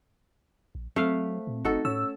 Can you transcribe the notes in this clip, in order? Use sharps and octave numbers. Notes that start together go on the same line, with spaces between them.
A#1
F#3 A3 C4 F5
A#2
F#1 D#4 F#4 A4
A2 C#4 E6